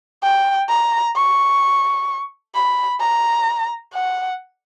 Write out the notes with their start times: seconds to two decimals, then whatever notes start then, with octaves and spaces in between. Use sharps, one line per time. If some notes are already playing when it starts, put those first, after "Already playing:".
0.23 G5
0.69 A#5
1.16 C#6
2.55 B5
3.01 A#5
3.94 F#5